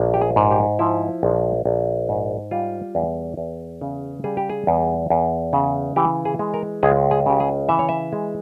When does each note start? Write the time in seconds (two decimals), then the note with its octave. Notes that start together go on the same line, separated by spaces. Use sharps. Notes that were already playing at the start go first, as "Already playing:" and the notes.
Already playing: A#1
0.14 G4
0.21 G#4
0.36 G#2
0.51 G4
0.79 F3 E4
1.23 A#1
1.65 A#1
2.09 G#2
2.51 G3 F4
2.95 E2
3.37 E2
3.81 C#3
4.24 G3 G#4
4.37 G4
4.50 G#4
4.67 E2
5.10 E2
5.53 C#3
5.96 E3 G4
6.25 G#4
6.39 G#3
6.54 A#4
6.83 C#2 G#4
7.11 G#4
7.26 C#3 G4
7.40 G#4
7.69 E3 E5
7.79 C#5
7.89 E5
8.13 G#3